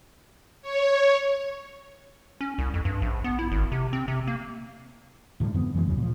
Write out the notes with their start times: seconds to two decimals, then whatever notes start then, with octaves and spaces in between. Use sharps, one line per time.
0.62 C#5
2.41 C#4
2.58 C2
2.74 F2
2.85 G2
3.02 A#1
3.24 B3
3.39 E4
3.52 G#1
3.72 C3
3.93 C4
4.08 C3
4.27 A#3
5.40 A2 D3 F3 G3
5.54 F2 G#2 F3 B3
5.74 F#2 E3 F3 G#3
5.86 A1 D#2 C#3 F#3
5.98 A#2 F3